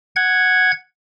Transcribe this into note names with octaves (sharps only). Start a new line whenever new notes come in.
F#5 G#6